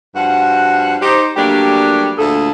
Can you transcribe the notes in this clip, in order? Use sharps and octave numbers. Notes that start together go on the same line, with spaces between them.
G2 F3 F#4 F#5
D#4 G4 C5
F#3 G3 A3 A#3 D4 G4
D2 A#2 G#4 A4